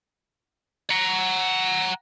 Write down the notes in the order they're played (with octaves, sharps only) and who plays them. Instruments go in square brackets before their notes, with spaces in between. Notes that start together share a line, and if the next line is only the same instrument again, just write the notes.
[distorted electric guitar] F#5 A#5